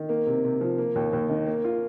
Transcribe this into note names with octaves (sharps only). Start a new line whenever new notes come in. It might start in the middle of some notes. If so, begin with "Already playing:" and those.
Already playing: D#3
A#3
C3
C3
F3
A#3
D#2
D#2
D#3
A#3
F4